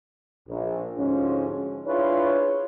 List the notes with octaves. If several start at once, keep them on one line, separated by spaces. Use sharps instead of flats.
A#1
D2 G#2 F3 C#4
D4 E4 F4 G#4 B4 C#5